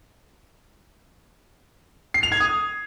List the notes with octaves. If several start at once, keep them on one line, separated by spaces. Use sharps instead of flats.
C7
F7
G#6
D#6